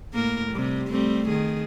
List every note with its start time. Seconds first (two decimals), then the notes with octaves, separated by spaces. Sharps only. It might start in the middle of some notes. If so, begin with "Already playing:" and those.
0.13 A2 A#3 A#4
0.52 C3 G3
0.90 G3 A3 C4
1.28 D#3 G#4